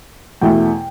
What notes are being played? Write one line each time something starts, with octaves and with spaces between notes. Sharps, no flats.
E2 B2 A3 E4 G5